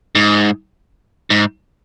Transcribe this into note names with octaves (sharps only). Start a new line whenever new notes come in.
G#2
G#2